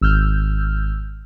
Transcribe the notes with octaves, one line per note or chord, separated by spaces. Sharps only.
G#1 E6 F6 G6